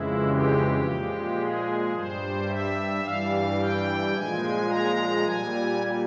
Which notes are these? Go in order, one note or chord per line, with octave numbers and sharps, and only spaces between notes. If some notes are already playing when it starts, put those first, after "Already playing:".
Already playing: F2 C#3 E3 G#3 E4
G4
A#2 F3 G#3
G#4
G2 G3 C5
E5
G2 E3 G3 F5
G5
A#2 F3 G#3 G#5
A#5
A#2 G3 G#5